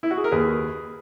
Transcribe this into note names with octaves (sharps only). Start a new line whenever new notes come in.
E4
F#4
G#4
A#4
D#2 G#4 B4